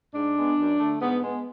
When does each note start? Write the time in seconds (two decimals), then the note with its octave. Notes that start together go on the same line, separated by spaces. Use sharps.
0.14 G#2 D4
0.36 G#3 B3
0.58 F#2
0.78 D3 A3
1.01 G#2 B3
1.22 G#3 B3